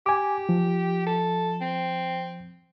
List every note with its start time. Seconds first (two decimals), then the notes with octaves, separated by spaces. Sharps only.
0.06 G4 G#5 D6
0.49 F3
1.07 A4
1.61 C4